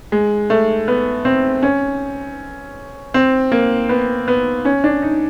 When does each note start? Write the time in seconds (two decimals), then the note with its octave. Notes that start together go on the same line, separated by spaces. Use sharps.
0.12 G#3
0.50 A3
0.88 B3
1.25 C4
1.63 C#4
3.14 C4
3.52 A#3
3.89 B3
4.28 B3
4.65 C#4
4.84 D4
5.02 D#4